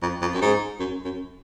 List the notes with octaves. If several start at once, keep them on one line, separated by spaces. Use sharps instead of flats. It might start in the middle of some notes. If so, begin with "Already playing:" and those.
F2
F2
F#2
G#2
F#2
F#2